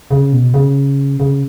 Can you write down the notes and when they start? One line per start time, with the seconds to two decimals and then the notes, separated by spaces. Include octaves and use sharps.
0.11 C#3
0.32 B2
0.54 C#3
1.20 C#3